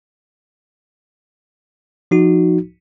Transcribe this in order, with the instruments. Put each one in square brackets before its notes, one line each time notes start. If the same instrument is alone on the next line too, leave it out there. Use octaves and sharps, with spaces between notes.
[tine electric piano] F3 D#4 F#4